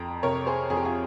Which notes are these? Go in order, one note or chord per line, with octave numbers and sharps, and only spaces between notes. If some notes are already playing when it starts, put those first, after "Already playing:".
Already playing: F2 G5 A#5
C3 A#4 C#5
G#4 C5
F2 G#4
G4
F4 G#4